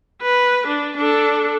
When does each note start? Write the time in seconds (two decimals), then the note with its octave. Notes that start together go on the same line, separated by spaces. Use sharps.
0.22 B4
0.67 D4
0.97 D4 A4